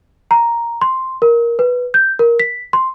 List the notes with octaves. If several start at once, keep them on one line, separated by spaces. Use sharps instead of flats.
A#5
C6
A#4
B4
G6
A#4
B6
C6